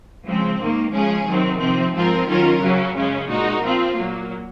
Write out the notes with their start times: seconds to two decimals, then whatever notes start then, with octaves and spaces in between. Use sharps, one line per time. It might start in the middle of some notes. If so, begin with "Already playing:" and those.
0.25 C#3 F3 G#3 C4
0.59 G#2 D#3 A#3
0.93 C#3 F3 G#3 C#4 G#4
1.26 C3 D#3 F#3 C4
1.59 C3 F3 C4
1.94 G#2 F3 C4 F4 A#4
2.27 D#3 F#3 C#4 F4 A#4
2.61 F#2 C#3 F#3 C#4
2.95 F#2 C#3 G#3 C#4
3.28 A#2 G#3 D#4 F#4 A#4
3.62 F3 C4 F4
3.96 A#2 F#3 A#3